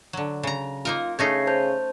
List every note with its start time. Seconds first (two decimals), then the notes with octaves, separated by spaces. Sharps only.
0.13 D3 F#3
0.43 C#3 A#5
0.85 A#3 D#4 F4 A#4
1.19 C#3 A3 C#4 D#4 G#6 A#6 C7
1.47 C5 A5 G6